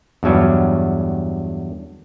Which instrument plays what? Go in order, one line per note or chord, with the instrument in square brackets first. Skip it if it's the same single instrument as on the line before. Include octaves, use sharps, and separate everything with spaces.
[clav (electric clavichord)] E2 G2 F#3 G3